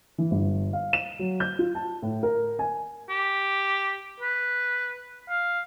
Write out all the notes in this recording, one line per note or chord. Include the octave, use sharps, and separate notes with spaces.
E3
G1
F5
E7
F#3
G6
F4
A5
A2
A#4
G#5
G4
B4
F5